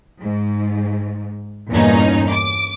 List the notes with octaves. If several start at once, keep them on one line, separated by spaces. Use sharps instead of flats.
G#2
E2 G2 A#2 A#3 C#4 D#4
D6